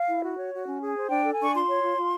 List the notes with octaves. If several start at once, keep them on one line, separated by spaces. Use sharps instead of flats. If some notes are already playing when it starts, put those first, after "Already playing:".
Already playing: F5
E4
F#4
C#5
F#4
C#4
G#4
C5
D4 G5
A4
G#5
D4 C#6
F4 C6
C#5
F4
F4